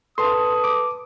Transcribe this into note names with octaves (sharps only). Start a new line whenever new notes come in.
A4 B4 A5 C6 D#6
D6